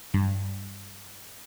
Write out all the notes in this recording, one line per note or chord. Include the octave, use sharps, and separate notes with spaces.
G2